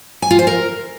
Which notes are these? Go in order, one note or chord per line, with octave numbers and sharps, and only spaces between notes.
G#5
F4
C5
A#4